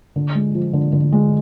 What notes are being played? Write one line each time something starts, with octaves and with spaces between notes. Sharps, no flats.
D3
G#3
F3
D3
D3
G#3